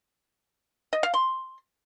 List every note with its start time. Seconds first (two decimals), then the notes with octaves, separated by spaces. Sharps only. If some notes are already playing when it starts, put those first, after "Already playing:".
0.93 D#5
1.03 F5
1.14 C6